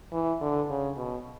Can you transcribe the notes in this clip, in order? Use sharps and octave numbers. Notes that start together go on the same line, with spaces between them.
E3
D3
C#3
B2